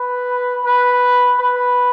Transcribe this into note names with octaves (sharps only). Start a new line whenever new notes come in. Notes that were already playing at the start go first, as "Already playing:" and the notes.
Already playing: B4
B4
B4